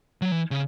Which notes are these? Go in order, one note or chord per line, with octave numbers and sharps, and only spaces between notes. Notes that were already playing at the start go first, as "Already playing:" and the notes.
F#3
E3
C#3